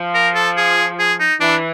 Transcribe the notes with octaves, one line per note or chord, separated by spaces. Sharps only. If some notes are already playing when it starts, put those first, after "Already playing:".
Already playing: F3
A#4
A4
G#4
G#4
D#4
E3 D4